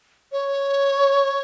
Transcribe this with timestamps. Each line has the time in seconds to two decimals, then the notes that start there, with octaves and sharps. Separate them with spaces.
0.32 C#5